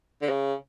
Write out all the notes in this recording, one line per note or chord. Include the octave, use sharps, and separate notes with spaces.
D3
C#3